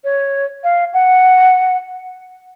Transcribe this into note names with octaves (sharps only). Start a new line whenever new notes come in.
C#5
F5
F#5